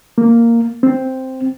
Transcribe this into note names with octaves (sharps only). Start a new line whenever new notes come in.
A#3
C4